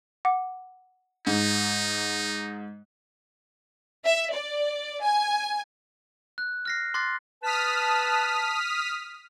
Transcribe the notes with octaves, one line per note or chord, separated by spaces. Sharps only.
F#5 D6
G#2 D#4
E5
D5
G#5
F#6
F6 A#6 C7
C6 D6 F#6 A6 C7
B4 A5 D#6 F6 B6